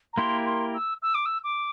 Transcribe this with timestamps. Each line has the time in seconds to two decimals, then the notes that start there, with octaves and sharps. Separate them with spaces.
0.13 A#5
0.17 A#3 E4 G4 A#4 C6
0.45 C6
0.74 E6
1.02 E6
1.14 D6
1.25 E6
1.43 D6